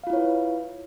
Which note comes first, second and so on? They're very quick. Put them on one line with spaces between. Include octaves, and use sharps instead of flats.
F5 F4 E4 C#5 B4